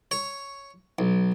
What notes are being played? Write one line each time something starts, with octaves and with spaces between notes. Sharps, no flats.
C#5
B1